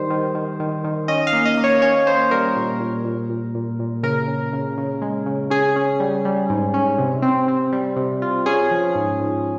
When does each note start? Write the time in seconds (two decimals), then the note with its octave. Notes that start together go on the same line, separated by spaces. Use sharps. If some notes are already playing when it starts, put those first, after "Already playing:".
Already playing: D#3 G3 C5
0.10 D#3
0.35 D#3
0.60 D#3
0.84 D#3
1.08 C#4 D#5
1.27 F5
1.33 A#3
1.45 D#5
1.57 A#3
1.64 C#5
1.82 C#4 C#5
2.07 A#3 C5
2.31 G3 A#4
2.56 A#2
2.80 A#2
3.05 A#2
3.30 A#2
3.55 A#2
3.79 A#2
4.03 C#3 A#4
4.28 C#3
4.53 C#3
4.78 C#3
5.02 G#3
5.26 C#3
5.50 C#4 G#4
5.76 C#4
6.00 G3
6.25 G3
6.50 G#2
6.74 C#4
6.98 C3
7.22 C4
7.48 C4
7.73 G3
7.96 C3
8.22 F4
8.46 C#4 G#4
8.71 F3
8.95 G#2
9.20 G#2